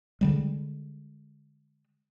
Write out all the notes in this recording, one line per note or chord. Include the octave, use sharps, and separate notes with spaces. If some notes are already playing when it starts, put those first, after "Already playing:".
D3 G3 G#3